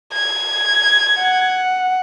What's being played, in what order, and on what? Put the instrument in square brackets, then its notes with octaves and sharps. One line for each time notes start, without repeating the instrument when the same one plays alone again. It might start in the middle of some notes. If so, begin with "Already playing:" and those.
[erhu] G#6
[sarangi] F#5